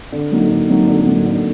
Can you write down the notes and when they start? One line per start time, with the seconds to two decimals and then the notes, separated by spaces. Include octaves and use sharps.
0.12 D3
0.32 F#3 A#3 D#4
0.50 D3
0.69 F#3 A#3 D#4
0.87 D3
1.06 F#3 A#3 D#4
1.26 D3